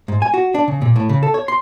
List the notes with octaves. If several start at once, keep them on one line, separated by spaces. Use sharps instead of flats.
G#2
G#5
F#4
D4
C#3
A#2
A2
C#3
A4
C#5
C6